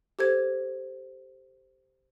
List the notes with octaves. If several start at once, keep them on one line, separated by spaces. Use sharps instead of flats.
G4 A4 C5 G#6